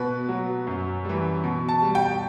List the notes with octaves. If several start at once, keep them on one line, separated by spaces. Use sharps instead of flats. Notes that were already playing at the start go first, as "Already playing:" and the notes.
Already playing: B2 B4
F#3
F#2
E3 G3
B2
A5
G3
G5